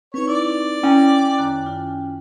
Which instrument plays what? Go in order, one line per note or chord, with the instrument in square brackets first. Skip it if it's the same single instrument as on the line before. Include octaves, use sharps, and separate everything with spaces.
[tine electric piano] C4 D#4 [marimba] B4 [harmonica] C#5
[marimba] E4 [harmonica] D5
[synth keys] C#4 [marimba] E4 A#5 A#6 [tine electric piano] G5
[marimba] F#2 D#3 F#6
F4